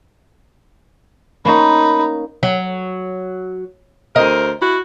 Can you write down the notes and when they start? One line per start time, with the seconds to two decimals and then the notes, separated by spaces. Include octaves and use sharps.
1.45 A#3 C#4 D#4 C#5 B5
2.43 F#3
4.16 D2 A#4 C5 D#5
4.61 E4 F#4